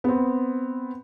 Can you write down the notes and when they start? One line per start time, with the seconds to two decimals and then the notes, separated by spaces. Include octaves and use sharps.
0.04 B3 C4